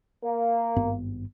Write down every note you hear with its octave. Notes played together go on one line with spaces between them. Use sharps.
A#3
G#1 G2 B3